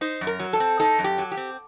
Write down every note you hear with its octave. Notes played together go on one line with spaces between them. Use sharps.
D#4 C5
F#2
A#4
F#3
A4
C4
D#4 A4
F#2
G4
F#3
G4
C4